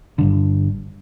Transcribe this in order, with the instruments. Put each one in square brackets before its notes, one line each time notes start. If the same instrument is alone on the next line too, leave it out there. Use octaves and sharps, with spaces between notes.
[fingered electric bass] G1 G2 D3